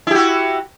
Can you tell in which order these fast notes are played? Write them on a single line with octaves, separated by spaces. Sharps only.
E4 G4 F#4